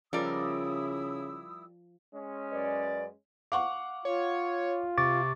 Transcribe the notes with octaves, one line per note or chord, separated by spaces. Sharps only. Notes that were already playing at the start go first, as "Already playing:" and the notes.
C#3 F3 G3 E4 A#4 D5 D#6 E6
G#3 C#4
F#2 B4 D5
F5 F#5 C#6 D6
F4 C#5
C3 C#6 D6 A6